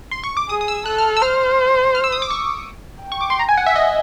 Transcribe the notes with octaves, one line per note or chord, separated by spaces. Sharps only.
C6
C#6
D6
G#4 D#6
D#6
E6
A4 F#6
F6
E6
C5 F6
F6
E6
D#6
D6
C#6
G5
C#6
D6
C6
A#5
G#5
F#5
E5
D#5